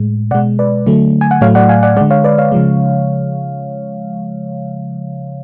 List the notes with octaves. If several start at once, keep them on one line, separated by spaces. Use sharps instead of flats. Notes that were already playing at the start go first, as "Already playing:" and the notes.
Already playing: A2 G#3
B2 G#3 D5 F#5
B4 D5
D3 F#3 A3
G#5
F#5
A2 F#3 A3 C#5 F5
D5 F#5
F5 G#5
D5 F#5
D3 G#3 D5 F#5
C#5 F5
B4 D5
C#5 F5
C#3 F3 G#3